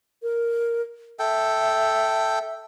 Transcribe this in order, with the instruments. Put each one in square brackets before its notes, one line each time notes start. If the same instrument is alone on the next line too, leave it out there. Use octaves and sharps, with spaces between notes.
[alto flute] A#4
[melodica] A4 G5 [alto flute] E5